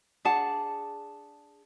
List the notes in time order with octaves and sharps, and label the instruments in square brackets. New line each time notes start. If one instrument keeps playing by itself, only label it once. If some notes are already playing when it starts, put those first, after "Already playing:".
[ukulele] D4 G#4 F#5 A5